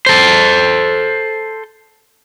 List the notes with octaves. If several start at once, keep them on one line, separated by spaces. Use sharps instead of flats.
A4 C5